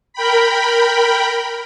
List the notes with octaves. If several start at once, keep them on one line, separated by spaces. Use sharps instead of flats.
A#4 G5 B5